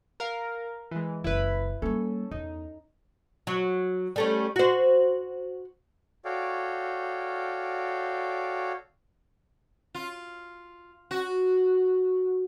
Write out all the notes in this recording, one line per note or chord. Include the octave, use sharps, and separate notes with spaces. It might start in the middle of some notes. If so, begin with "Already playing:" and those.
A#4 F5
E3 G#3
F#1 C#4 E4 B4
G3 A#3 C#4 A4
E2 D#4
F#3
G3 A3 C#4
F#4 C5
F#4 A4 C#5 D5 F5 G5
F4
F#4